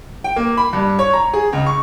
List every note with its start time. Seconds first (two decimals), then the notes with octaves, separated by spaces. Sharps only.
0.24 G5
0.36 A#3
0.57 B5
0.73 G2
0.99 C#5
1.13 A#5
1.33 G#4
1.53 C#2
1.66 C#6